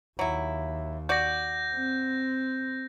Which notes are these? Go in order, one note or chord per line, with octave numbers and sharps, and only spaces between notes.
D#2 F#3 E4
F#4 D5 G6 A#6
C4